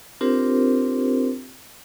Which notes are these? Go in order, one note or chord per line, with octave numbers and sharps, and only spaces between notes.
C4 D4 F4 G4 A#4 C5